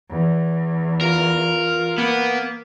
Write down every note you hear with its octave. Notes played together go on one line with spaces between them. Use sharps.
E2
F4 A#4
A#3 B3